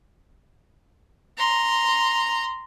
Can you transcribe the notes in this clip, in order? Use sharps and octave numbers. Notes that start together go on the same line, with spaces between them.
A#5 C6